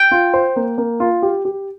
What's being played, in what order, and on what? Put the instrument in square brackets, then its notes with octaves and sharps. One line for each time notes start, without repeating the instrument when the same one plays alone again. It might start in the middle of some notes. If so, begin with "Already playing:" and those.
Already playing: [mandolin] G5
[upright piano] F4
C5
A#3
A#3
F4
G4
G4